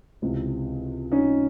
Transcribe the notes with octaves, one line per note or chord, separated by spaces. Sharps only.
C#2 C3 E3
C#4 D#4